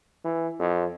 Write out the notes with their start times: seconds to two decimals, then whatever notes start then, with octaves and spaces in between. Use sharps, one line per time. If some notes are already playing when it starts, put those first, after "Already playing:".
0.25 E3
0.59 F2